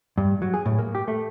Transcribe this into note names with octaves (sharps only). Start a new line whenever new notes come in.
G2
F#3
G#4
A2
A#3
G4
A3